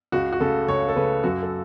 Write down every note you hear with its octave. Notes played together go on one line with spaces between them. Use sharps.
C#2 F#4
F#4
C#3 A3 A4
C#2 C#5
A4
C#3 A3 B4
F#2 F#4
A4